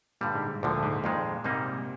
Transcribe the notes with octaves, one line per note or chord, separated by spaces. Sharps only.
G2 A#2 D3 G3
G#2
G#2
D2 A#2 D3 F3
G#2
F2 A#2 D#3 G#3
G#2 C3 G3 A#3 D#4